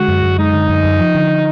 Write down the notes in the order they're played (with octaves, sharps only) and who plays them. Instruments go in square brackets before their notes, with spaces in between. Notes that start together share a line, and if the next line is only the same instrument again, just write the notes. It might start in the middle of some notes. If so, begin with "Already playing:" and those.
Already playing: [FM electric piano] D3 G#3 [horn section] F#4
[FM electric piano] F#2
F#2
[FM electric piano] G#3 [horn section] D#4
[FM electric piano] D3
F#2
F#2
F3
D3